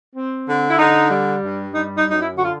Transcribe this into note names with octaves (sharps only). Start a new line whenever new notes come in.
C4
D3
E4
D3 D#4
G3
G2
G3 D#4
D#4
F#2
D#4
E4
D3 F#4
F4